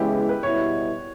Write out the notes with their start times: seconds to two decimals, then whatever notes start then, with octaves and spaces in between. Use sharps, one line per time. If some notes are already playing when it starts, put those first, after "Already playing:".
Already playing: C#3 E3 G#3 B3 E4 G4
0.29 B4
0.43 B2 G3 B3 E4 C#5